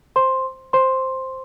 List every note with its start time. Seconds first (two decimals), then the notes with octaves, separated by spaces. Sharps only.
0.16 C5 C6
0.73 C5 C6